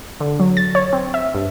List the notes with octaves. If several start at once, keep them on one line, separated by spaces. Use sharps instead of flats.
D3
F#3
A6
C#5
C4
E5
G2